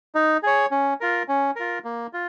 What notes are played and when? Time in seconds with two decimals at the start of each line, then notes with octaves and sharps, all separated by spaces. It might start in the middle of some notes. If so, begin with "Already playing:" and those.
0.15 D#4
0.43 G#4 C#5
0.71 C#4
1.00 F4 A#4
1.28 C#4
1.56 F4 A#4
1.84 A#3
2.13 F4